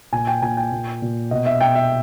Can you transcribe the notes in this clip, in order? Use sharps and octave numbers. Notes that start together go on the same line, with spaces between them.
A#2 G#5
G5
A#2 G#5
G5
A#2
A#2
B2 D#5
E5
B2 G5
E5